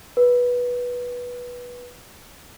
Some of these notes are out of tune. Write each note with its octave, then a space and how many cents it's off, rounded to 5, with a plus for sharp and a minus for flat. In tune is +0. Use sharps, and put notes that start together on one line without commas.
B4 -15